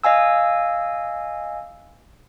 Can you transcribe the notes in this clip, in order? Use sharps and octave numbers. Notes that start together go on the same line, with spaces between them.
D#5 F5 G#5 E6